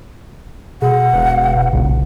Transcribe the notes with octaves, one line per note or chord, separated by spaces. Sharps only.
B2 G#4 F#5
E1 B4 F5
E1 B1 A#2 C#3